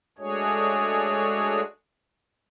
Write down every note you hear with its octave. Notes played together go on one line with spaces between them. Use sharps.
G#3 A3 D4 F#4 G#4 C#5